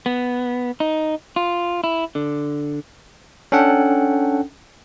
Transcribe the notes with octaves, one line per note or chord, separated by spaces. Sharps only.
B3
D#4
F4
E4
D3
C#4 D4 A4 F#5 G5